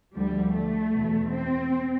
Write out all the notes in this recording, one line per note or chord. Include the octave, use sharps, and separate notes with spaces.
D2 D3 F3 G3
A3
E2 B2
C4